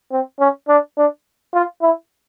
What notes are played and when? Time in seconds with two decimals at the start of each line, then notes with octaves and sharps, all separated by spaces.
0.12 C4
0.40 C#4
0.69 D4
0.97 D4
1.54 F4
1.82 E4